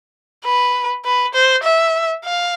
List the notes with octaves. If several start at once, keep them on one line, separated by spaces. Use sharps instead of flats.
B4
B4
C5
E5
F5